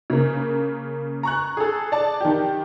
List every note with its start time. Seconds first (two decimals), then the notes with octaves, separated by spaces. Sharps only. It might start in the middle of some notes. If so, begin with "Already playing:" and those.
0.10 C#3 A#3
1.23 A#5 C#6 F#6
1.57 G#4 A4
1.92 D5 A5
2.21 D#3 G4